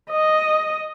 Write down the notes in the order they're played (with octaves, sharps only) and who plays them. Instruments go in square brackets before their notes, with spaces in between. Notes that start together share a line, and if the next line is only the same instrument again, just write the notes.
[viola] D#5